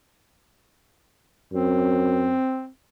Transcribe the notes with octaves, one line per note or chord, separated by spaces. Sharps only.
F#2 C4